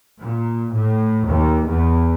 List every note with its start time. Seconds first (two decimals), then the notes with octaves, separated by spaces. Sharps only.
0.21 A#2
0.74 A2
1.27 D#2
1.67 E2